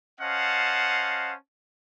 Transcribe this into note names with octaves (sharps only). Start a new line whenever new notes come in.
C#4 C5 D#5 F5 F#5 A5